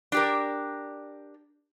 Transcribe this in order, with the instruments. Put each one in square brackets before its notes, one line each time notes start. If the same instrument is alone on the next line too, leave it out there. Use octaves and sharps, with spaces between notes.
[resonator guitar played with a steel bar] D4 G4 A#4